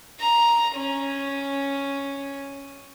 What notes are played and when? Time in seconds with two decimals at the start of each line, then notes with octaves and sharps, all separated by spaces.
0.20 A#5
0.75 C#4